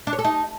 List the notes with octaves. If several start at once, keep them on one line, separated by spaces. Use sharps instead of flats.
D4
C#5
A4
D#4